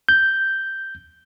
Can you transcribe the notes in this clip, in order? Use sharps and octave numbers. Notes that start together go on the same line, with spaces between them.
G6